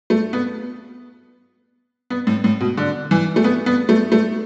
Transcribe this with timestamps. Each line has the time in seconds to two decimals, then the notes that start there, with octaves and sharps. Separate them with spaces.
0.10 A3
0.33 B3
2.10 B3
2.27 A2
2.44 A2
2.61 B2
2.77 D3
3.11 E3
3.36 A3
3.44 B3
3.66 B3
3.89 A3
4.12 A3